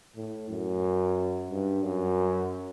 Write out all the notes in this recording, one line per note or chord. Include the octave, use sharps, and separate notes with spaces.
A2
F#2
G2
F#2